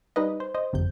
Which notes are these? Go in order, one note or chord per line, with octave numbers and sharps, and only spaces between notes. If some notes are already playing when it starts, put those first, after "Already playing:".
G3 D#4 B4 D#5
C5
C5 D#5
G1 F2 C3 G6